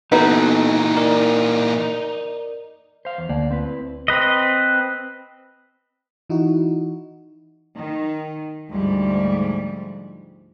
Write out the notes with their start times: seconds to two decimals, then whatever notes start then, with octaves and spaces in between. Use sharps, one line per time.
0.12 A#2 E3 B3 D#4 F#4 A4 B4
0.97 A#4 D5 D#5
3.05 C5 F5
3.18 E2
3.29 D2 A#3 D5
3.51 C4 E4 B4
4.08 C4 B4 D#5
6.30 E3 D#4 E4 F#4
7.76 D#3
8.68 D2 G#2 F3 G3